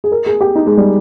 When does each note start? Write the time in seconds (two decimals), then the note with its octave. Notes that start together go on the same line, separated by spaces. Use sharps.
0.04 G#4
0.12 A#4
0.26 G#4
0.41 G4
0.55 D#4
0.67 G#3
0.78 G3